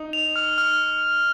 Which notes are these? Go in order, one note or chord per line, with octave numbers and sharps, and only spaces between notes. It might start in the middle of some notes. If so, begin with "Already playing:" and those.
Already playing: D#4
F7
F6
F6